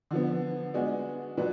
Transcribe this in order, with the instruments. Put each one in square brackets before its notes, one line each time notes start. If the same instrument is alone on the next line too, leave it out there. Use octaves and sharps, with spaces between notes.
[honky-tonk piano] D3 F3 B3
G#3 B3 D4 F#4
A#2 F#3 D4 F#4 B4